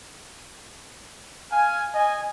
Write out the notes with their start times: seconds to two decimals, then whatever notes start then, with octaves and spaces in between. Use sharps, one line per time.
1.51 F5 G#5
1.94 D#5 G#5